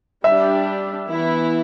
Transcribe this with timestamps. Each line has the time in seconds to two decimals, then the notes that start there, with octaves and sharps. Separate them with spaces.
0.24 G3 D4 G4 E5
1.08 E3 B3 E4